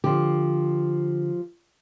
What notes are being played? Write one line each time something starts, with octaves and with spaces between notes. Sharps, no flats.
D3 F3 G4